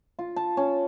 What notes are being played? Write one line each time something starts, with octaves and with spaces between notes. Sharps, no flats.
F4
A5
C#4